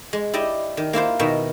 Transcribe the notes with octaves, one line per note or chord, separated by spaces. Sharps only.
G#3
E4 G4 D5 D#5
D#3
A#3 E4 F4 C5
B2 D#3 E4 A#4